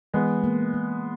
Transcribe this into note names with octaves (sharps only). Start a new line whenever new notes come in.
E3 G#3 B3
A#3
A#3